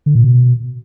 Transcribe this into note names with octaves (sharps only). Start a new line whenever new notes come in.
D3
A#2
B2